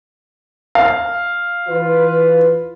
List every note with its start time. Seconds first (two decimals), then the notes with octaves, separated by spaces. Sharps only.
0.75 F5
1.69 E3 F4 B4